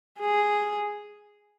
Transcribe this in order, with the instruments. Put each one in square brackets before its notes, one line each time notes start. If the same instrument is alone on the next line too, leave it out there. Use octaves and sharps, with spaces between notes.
[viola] G#4